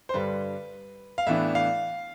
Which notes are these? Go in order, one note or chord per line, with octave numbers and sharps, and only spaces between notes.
C5
G2 D3 G3 B4
F5
A2 E3 B3 D4 E5
F5